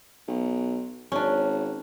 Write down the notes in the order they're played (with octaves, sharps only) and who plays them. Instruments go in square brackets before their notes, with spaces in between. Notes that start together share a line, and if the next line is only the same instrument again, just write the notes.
[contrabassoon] B1
[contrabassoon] G#1 [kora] C#4 D4